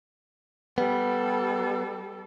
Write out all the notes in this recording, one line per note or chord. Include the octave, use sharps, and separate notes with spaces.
G3 B3 A4